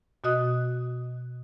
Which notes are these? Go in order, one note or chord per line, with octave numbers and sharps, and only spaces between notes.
B2 F#4 D#5 D#6 F#6